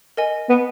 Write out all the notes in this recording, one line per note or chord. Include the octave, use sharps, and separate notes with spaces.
A#4 D#5 G#5
B3